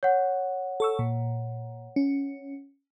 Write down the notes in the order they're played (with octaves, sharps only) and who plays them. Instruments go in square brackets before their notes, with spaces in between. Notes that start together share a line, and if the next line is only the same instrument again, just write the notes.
[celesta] C#5 F#5
[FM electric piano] A4 C#6 E6
A#2
C#4